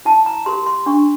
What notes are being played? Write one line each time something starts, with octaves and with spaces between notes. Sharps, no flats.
E4 A5
A#5
G4 A#4 C6
C6
D4 C#6